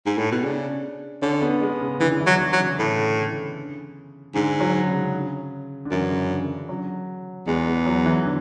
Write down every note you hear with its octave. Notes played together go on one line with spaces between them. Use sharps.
G#2
A2
B2
C#3 D4
D3 C#4
B3
G#3
C#3
D3 E3
E3
F#3
D3
F#3
C#3
A2
G#2 D3
F#3
C#3
D3
F#2 E3
C#3
D3
F#3
E2 G#3
G#3
F#3
E3
D3